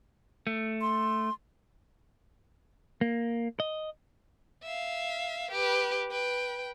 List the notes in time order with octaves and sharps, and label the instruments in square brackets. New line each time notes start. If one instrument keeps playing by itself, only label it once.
[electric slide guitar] A3
[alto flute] C6
[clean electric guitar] A#3
D#5
[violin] E5 F5
G4 B4
B4 G5